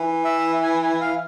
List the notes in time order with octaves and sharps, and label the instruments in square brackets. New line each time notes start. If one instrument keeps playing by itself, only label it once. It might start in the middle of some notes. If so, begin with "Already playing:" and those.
Already playing: [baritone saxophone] E3
[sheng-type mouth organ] E5
G#5
G#5
F5